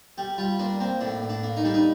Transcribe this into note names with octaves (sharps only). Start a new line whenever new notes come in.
G3 G4
G3 F4
A#3 D4
A#3 C4
A2 D4
A2
D4
A#3
D#4
G3 D4
D#4